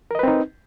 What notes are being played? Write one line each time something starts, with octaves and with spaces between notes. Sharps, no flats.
C4 D#4 A#4 B4 D#5